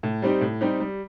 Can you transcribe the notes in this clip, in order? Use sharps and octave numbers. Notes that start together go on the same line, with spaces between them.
A2
G3 C4 D#4 G4
A2
G3 C4 D#4 G4
G3